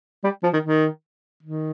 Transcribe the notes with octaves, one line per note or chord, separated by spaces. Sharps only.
G3
F3
D#3
D#3
D#3